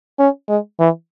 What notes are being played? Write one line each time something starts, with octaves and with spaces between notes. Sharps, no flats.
C#4
G#3
E3